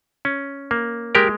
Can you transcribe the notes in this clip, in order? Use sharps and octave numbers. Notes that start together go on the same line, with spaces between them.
C#4
A#3
G#3 G4 A#4